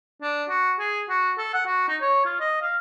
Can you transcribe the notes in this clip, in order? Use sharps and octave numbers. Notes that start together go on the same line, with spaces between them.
D4
F#4
G#4
F#4
A4
F#5
F#4
D#4
C#5
F4
D#5
F5